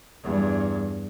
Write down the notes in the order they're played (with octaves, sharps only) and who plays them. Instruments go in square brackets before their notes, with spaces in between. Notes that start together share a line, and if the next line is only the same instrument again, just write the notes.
[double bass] E2 G2